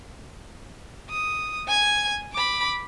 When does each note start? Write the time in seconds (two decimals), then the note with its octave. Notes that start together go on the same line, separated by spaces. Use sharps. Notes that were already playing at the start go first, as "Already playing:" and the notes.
1.10 D#6
1.67 G#5 G#6
2.33 B5 D6